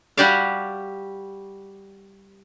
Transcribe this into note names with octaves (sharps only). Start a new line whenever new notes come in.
G3 F#4 G4 D5 F5